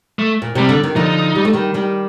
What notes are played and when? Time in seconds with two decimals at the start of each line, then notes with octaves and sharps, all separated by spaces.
0.19 A3
0.42 A#2
0.55 C3 G3
0.69 D3
0.83 D#3
0.96 D3 F3 D#4
1.35 G3
1.45 A3
1.53 D#3 G3
1.74 D#3 G3